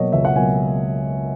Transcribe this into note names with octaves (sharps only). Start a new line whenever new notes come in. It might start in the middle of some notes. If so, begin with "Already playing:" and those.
Already playing: B2 F#3 A#3 C#5 D#5
C#2 E5
F#5
B2 F#3 A#3 G#5